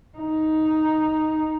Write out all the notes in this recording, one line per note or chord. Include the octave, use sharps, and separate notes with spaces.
D#4